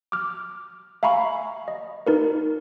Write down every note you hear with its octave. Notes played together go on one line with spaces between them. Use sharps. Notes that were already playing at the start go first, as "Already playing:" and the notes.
D6 F6
E5 F5 G#5 A#5 B5 C#6
D#5
D#4 A#4 B4